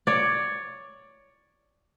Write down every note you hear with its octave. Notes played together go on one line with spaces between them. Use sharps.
C#5 D5